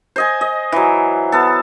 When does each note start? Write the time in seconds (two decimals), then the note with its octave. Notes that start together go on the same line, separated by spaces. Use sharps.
0.16 C5 D#5 G#5
0.41 D#5
0.72 E3 F#3
1.32 B3 A4